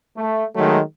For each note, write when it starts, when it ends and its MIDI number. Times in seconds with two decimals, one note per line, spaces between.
0.16 0.45 57
0.56 0.80 51
0.56 0.80 54
0.56 0.80 56
0.56 0.80 57